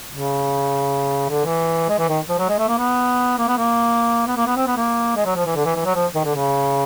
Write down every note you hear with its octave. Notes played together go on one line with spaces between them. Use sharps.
C#3
D3
E3
G#3
E3
D#3
F3
F#3
G#3
A3
A#3
B3
A#3
B3
A#3
B3
A#3
B3
C4
B3
A#3
G#3
F#3
F3
E3
D3
E3
E3
F#3
F3
D#3
D3
C#3